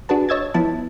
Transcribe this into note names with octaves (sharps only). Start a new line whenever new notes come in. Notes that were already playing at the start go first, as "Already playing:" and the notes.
D4 F#4 G#4 B4 A5
C#5 D#5 E6 G#6 A6
F3 B3 E4 A5